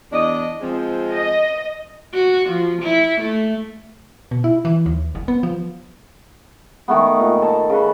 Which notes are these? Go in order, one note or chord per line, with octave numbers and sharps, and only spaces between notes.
E2 D4 D#5
F3 G#3 C4
D#5
F#4
F3
E4
A3
B2
E4
E3
D#2
F#1
B3
F3
D#3 A3 B3
A#2
A4 A5
C#3 B4